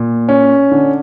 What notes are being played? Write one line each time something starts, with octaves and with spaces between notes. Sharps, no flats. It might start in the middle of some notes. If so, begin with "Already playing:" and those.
Already playing: A#2
C#4
D3